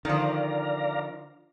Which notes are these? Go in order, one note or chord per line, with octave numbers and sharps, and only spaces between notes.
D3 D#3 F3 D5 F5 A#5